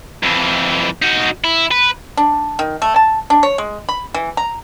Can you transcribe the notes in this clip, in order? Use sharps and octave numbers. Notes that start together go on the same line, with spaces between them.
F2 E3
D#4 F#4
E4
B4
D4
D#3
A3
A5
D4
C#5
G#3
B5
E3
A#5